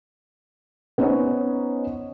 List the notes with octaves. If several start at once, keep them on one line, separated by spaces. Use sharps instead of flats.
B3 C#4 D#4 C5 C#5